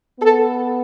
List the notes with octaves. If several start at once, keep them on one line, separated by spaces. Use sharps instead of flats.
B3 A4